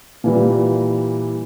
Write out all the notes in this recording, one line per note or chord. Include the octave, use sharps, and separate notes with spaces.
A#2 E3 G3